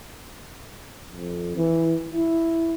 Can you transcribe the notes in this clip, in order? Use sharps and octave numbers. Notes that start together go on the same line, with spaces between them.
F2
E3
E4